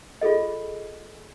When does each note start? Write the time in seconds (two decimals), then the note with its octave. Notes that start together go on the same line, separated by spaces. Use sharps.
0.21 F4 G#4 A4 D#5